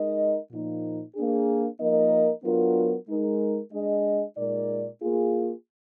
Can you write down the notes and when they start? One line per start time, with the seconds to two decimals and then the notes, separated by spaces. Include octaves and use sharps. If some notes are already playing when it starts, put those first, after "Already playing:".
Already playing: G#3 D#4 A#4 D#5
0.51 A#2 F3 A#3 D#4
1.15 A#3 D4 G#4
1.79 F3 A#3 D#4 A#4 D#5
2.44 F#3 B3 D4 F4 A#4
3.08 G#3 D#4 A#4
3.72 G#3 D4 G#4 D#5
4.37 A#2 G#3 D#4 A#4 D5
5.01 A#3 F4 G#4